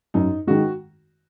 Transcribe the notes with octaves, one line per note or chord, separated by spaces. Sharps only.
F#2 D#4
D#3 G#3 F#4